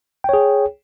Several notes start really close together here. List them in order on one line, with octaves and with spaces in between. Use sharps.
G5 C#5 G#4